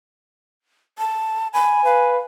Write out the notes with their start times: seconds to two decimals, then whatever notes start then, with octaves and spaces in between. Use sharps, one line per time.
0.98 A5
1.54 G#5 B5
1.85 B4 F5